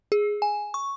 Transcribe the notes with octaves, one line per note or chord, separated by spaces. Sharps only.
G#4
G#5
C#6